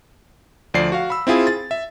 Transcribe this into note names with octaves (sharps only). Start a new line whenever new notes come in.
D2 F3 D5 C7
F#4 F5
B5 E6
C4 E4 F4 G#4
A6
E5